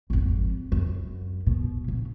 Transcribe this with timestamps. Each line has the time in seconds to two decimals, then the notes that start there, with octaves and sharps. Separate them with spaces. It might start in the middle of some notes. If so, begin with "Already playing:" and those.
0.10 G#1 F2
0.72 F#2
1.47 B2
1.88 A#1